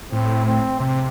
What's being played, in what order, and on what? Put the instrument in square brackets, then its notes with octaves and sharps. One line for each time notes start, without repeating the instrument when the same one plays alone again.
[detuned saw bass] A2 [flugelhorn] C4
[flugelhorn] C4
[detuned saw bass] C3 [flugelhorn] C4